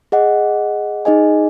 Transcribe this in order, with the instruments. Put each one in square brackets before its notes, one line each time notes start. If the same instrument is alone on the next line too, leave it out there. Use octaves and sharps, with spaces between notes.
[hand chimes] G#4 D#5 F#5
D#4 G#4 D#5 G#5